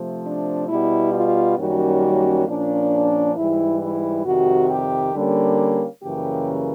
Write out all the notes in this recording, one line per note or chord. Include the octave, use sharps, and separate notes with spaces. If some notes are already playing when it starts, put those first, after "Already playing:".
Already playing: C3 F3 A3
D4
B2 G3 B3 E4
F4
F#2 D#3 G3 A#3 C#4 F#4
A#2 F3 A#3 C#4 D4
G#2 E3 G3 E4
E4
F2 C3 D#3 G3 F#4
G4
D3 G3 A#3 C#4
F#2 C#3 E3 G3 A#3 G4